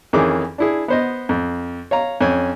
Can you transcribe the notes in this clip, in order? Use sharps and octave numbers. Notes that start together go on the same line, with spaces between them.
F2 D#3 E3 C#4 G#4 D6
D4 E4 G#4
B3 C5 D#5
F2
C#5 F5 A#5
F2 C#4 G#5